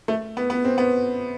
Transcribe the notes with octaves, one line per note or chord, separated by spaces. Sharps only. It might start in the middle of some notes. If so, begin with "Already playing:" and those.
A3
B3
B3
C4
B3